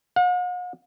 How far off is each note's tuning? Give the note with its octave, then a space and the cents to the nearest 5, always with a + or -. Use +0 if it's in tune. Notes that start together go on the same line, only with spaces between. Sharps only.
F#5 -45